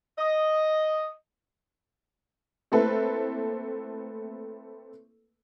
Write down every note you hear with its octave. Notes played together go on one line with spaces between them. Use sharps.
D#5
A3 A#3 C4 E4 A4 B4